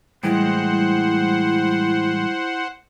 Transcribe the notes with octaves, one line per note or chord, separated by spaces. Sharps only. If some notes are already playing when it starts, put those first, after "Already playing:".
A2 E3 G3 G#3 E4 C5 F#5